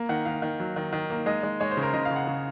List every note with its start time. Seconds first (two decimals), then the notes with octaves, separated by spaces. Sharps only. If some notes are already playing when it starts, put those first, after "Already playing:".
Already playing: A#3
0.09 D#3 F#5
0.25 D#3 F5
0.42 D#3
0.60 F#3
0.76 D#3
0.93 D#3
1.10 A#3
1.26 G#3 D#5
1.43 G#3
1.60 G#3 C#5
1.71 C5
1.77 C#3
1.82 A#4
1.94 C#3 D#5
2.05 F5
2.11 C#3
2.16 F#5
2.27 C#3